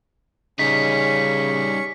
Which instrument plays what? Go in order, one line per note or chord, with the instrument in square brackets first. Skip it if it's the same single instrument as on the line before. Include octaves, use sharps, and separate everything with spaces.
[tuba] C#3 [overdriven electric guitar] G3 D#4 [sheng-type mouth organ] C#4 C#6 [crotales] B6